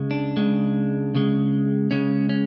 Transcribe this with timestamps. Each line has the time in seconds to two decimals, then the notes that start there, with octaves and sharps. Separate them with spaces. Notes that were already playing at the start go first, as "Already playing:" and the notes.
Already playing: C#2 C#3 G#3
0.11 D4
0.37 C#2 C#3 G#3
1.14 C#2 C#3 G#3
1.91 C#2 C#3 G#3 C#4
2.29 C#4